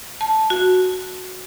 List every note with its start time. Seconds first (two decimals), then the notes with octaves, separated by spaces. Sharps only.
0.21 A5
0.50 F#4